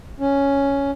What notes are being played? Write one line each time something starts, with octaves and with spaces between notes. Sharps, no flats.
C#4